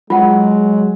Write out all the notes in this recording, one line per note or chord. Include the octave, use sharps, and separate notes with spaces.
F#3 G#3 F4 F#5